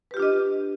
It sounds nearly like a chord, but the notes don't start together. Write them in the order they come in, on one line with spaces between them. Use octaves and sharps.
B4 G4 F4 D4 D#5